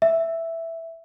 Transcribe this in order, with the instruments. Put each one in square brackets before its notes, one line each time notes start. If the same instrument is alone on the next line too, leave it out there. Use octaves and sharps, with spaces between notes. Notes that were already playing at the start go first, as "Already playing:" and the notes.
[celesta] E5